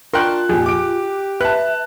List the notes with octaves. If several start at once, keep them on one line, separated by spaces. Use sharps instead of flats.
D4 F4 A#4 G5 C6 C#6 F#6
F2 A#2 G4 G#4
D6 D7
B4 E5 A5 F#6